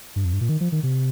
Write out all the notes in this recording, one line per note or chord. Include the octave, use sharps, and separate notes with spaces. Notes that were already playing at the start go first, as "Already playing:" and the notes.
G2
F2
G2
A#2
D#3
F3
D#3
C3